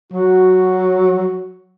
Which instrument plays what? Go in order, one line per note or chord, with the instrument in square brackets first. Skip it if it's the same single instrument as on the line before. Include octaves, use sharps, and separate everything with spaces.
[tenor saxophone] F#3 [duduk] F#4